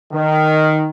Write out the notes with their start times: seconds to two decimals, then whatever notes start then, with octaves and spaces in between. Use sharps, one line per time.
0.13 D#3